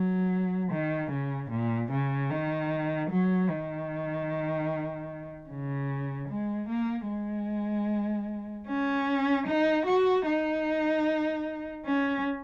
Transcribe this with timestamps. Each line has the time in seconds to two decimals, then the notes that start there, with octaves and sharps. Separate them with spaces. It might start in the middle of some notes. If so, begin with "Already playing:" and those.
Already playing: F#3
0.71 D#3
1.11 C#3
1.50 A#2
1.91 C#3
2.30 D#3
3.10 F#3
3.49 D#3
5.49 C#3
6.28 G#3
6.68 A#3
7.08 G#3
8.67 C#4
9.47 D#4
9.86 F#4
10.26 D#4
11.85 C#4